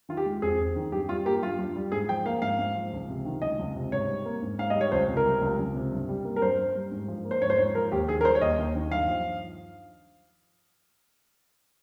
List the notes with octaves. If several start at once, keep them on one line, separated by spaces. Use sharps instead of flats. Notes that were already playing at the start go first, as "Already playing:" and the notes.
D#3 F4
G4
G#3
F2 G#4
F2
D#3
G2 G4
G3 F4
A#3 G4
G2 F4
G2
G3
G#2 G#4
F3 G5
A#3 F5
G#2 F5
G#2
F3
C#2
C3
D#3
C#2 D#5
C#2
C3
G#2 C#5
G3
A#3
G#2
G#2 F5
G3 D#5
C#5
C#2 C5
C3
A#4
G3
C#2
C#2
C3
G2
G3
A#3
A#4
G2 C5
G2
G3
G#2
F3
A#3
C5
G#2 C#5
C5
G#2 C#5
F3 A#4
D#2 G4
D#3 G#4
A#4
G3 C5
C#5
D#2 D#5
D#2
D#3
G2 F5
F3